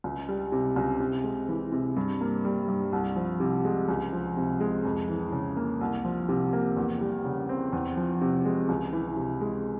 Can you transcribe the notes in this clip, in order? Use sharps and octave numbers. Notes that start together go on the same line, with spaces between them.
C#2
G3
C3
C#2
C3
G#3
E3
C3
G2
A#3
G3
G2
C2
F3
C3
G#3
C#2
F3
C3
G#3
F2
E3
C#3
A#3
C2
F3
C3
A#3
E2
G3
C#3
C4
E2
F3
C3
G#3
C#2
E3
C3
G#3